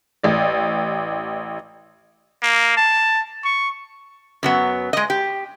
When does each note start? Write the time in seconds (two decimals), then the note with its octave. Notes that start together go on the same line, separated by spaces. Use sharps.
0.23 A1 D5
2.43 A#3
2.77 A5
3.44 C#6
4.43 F#2 F#3 B3
4.93 G#3 D#5
5.10 G4